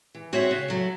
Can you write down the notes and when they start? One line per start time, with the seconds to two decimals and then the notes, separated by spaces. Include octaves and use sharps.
0.15 E3
0.33 C4 F#4 C#5 E5
0.51 C#3
0.68 F#3 A3